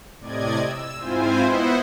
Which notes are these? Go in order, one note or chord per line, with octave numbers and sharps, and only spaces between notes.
A2 C3 D5 D#5 G#6
E6
G#2 C4 E4 F4 C5 G#5
B3 E4 C5 D#5 E5 F#5